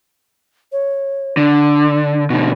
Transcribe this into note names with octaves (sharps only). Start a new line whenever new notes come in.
C#5
D3 D4
B2 D3 D#4